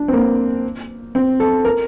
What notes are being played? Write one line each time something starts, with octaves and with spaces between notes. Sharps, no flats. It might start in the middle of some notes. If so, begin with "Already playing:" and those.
Already playing: D4
C4
A#3
C4
A4
A#4